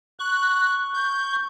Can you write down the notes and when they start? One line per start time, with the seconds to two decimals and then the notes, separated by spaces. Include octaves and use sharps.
0.20 C#6 F#6
0.94 G6